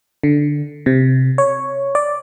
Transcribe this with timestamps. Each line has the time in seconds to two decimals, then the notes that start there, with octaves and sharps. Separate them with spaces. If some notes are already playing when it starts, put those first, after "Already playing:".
0.23 D3
0.86 C3
1.38 C#5
1.95 D5